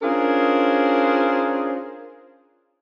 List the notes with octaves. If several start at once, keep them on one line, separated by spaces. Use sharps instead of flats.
C#4 D4 F4 G#4 A#4 C5